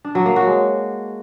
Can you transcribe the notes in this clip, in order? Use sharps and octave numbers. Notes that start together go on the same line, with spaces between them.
D4
F#3
A#3
F#4
G#3